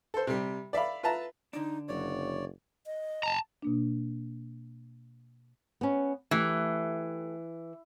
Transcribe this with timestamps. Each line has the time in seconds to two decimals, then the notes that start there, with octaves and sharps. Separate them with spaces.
0.14 A4 C5
0.27 C3 G3
0.73 D5 E5 F5 B5
1.03 F4 B4 E5 A5 A#5
1.53 D3 D4 D#4
1.88 F#1 F#3 C#5 D5
2.86 D#5
3.23 A5 A#5
3.62 B2 A#3 D4
5.81 B3 C#4
6.31 E3 A3 G4